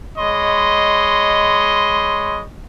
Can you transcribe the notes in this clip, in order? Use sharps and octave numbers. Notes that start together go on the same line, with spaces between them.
G#3 C#5 D#5 B5 C6